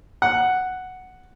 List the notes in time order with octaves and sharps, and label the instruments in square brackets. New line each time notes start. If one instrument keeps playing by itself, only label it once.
[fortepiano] F#5